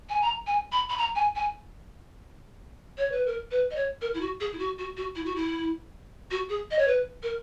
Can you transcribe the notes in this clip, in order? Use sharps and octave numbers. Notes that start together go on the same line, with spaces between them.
G#5
A#5
G#5
B5
B5
A#5
G#5
G#5
C#5
B4
A#4
B4
D#5
C#5
A#4
E4
F#4
G#4
E4
F#4
F#4
F#4
E4
F#4
E4
F#4
G#4
D#5
C#5
B4
A#4